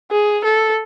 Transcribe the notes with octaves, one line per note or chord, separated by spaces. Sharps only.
G#4
A4